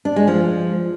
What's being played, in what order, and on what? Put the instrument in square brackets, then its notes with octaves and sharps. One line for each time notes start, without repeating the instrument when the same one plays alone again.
[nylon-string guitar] D4
G#3
F3